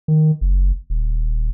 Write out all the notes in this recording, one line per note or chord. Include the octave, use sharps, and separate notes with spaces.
D#3
F#1
D#1